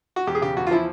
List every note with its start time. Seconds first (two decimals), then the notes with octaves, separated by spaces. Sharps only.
0.16 F#4
0.27 E2 G4
0.35 G#4
0.41 C#3 G4
0.57 E2 F#4
0.67 F4
0.71 F3 E4